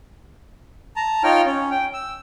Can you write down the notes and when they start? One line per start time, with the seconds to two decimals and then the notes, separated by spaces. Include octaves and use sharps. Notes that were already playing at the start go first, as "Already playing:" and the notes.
0.96 A5 A#5
1.24 D#4 F4 C#5 G5 F6
1.46 C#4
1.71 G5
1.94 E6